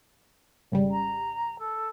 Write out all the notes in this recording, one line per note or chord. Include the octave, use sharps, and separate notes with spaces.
G#1 C#3 G3
A#5
A4